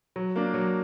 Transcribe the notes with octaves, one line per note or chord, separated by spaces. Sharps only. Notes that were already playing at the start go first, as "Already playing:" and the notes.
F#3
A#3 D4
F#3